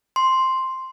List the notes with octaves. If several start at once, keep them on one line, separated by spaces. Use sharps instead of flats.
C6